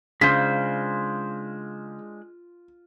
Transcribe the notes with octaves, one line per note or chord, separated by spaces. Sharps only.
C#3 G#3 D4 F4 C5 B6